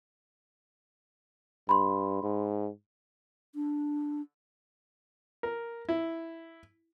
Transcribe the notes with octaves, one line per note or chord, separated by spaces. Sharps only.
G2 B5 C6
G#2
D4
A#4
E4